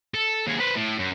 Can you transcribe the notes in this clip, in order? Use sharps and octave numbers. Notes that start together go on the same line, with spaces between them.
A4
D#2 G#4
B4 C5
A2
F#2